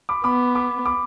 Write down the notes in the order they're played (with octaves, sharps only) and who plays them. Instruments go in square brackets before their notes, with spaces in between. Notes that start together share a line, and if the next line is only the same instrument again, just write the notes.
[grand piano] B5 D6
[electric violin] B3 [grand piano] B5 D6
[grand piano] B5 D6
B5 D6